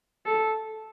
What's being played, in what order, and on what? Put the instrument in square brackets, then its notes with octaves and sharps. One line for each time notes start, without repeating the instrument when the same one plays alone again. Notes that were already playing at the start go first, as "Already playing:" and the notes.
[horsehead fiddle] A4